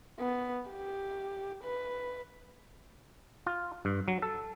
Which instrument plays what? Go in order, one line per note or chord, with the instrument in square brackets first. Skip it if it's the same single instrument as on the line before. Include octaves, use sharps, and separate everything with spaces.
[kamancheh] B3
G4
B4
[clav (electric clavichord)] F4
G2
F#3
A4